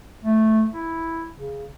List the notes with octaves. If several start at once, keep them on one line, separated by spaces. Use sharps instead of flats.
A3
E4
C#3